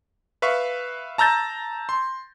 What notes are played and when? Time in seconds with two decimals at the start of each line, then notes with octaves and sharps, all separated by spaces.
0.42 B4 E5 F5 C#6
1.18 A5 A#5 E6 G6 A6 A#6
1.89 C6